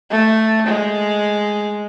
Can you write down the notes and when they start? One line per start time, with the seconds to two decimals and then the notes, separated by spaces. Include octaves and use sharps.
0.11 A3
0.66 G#3